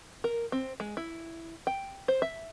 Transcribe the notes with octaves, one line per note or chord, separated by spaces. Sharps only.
A#4
C4
G#3
E4
G5
C5
E5